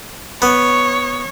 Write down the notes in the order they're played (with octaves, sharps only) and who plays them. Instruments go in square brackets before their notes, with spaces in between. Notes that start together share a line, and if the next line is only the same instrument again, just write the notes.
[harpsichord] B3 [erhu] C#5